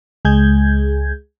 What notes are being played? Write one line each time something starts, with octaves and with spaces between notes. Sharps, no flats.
C#2 G#3 G#4 G6 G#6